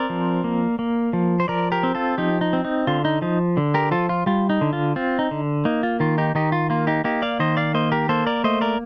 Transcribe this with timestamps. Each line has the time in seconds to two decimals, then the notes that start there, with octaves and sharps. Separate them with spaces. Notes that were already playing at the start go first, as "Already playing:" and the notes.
Already playing: C4 A#4 D5
0.10 F3
0.44 A#3
0.79 A#3
1.13 F3
1.40 C5
1.48 F3 A#4 D5
1.72 G4 A#4
1.83 C4
1.95 F4 A4
2.18 F3 D#4 G4
2.41 D#4
2.53 C4
2.65 D#4
2.87 D3 F4
3.05 D#4
3.22 F3 D#4
3.57 D3
3.74 G4 A#4
3.91 F3 F4 A4
4.09 F4
4.26 G3 F4
4.50 D#4
4.61 D3
4.73 F4
4.96 C4 F4
5.19 D#4
5.31 D3
5.65 A#3 D#4
5.83 F4
6.00 D#3 F4
6.18 D#4 G4
6.35 D#3 D#4 G4
6.52 F4
6.70 A#3 F4
6.87 D#4 G4
7.04 A#3 D#4 G4
7.22 D5 F5
7.40 D#3 C5 D#5
7.57 D5 F5
7.74 A#3 C5 D#5
7.92 G4 A#4
8.09 A#3 A4 C5
8.27 A#4 D5
8.44 A3 C5 D#5
8.61 A#4 D5